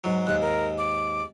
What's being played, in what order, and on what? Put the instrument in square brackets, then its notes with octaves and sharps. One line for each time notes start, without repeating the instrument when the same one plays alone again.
[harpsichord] G#2 F#3
[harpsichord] D#2 G#2 [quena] F#6
[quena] A#4
D6